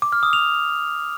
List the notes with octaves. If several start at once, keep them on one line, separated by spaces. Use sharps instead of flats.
D6
F6
D#6
F7